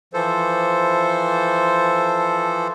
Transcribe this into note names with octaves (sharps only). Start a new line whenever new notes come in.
E3 F3 A4 C5